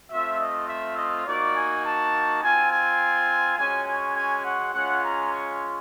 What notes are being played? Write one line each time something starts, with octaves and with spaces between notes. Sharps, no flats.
A3 C4 F4 E5
D#5
E5
D#5
A#3 D#4 F#4 D5
G#5
A5
C4 F4 G#5
G#5
G#3 C#4 F#4 G#5
G#5
G#5
F#5
G#3 C#4 F4 F#5
A#5
C#6